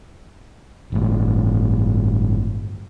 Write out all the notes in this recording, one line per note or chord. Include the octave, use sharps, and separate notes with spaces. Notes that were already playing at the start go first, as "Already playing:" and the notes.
G1 A2